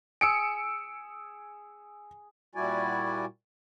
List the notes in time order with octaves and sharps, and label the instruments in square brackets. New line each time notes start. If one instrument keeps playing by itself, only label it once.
[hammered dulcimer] G#4 [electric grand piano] E6 C#7 D7
[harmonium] A#2 G3 E4 F#4 D5 G#5